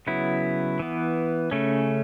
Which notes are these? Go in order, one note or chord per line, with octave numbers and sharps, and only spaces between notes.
C#3 F#3 B3 E4
E3 B3
C#3 A3 C#4